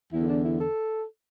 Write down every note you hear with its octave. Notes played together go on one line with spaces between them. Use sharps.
E2 D3 E4
D4
E4
A4